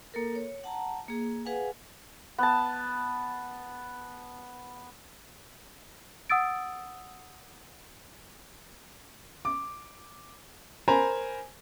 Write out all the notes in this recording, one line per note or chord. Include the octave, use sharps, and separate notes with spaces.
A#3 A4 A#4
C#5
F#5 A5 A#5
A#3 G#4
G#4 B4 F5 F#5 G#5
B3 A5
F#5 D#6 E6 A6 D7
D6
A#4 C5 G#5 A#5 B5